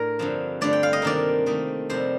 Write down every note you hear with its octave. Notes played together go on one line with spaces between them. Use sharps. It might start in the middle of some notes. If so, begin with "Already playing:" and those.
Already playing: A2 D4 A#4
G2 D3 F3 C4
G2 D3 A3 D5
G5
F5
D#5
C3 D#3 A#3 D4 F4 D5
D#3 A3 C4 D#4
F2 C3 G3 C5